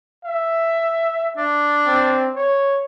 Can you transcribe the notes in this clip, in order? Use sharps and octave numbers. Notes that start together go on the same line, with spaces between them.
E5
D4
C4
C#5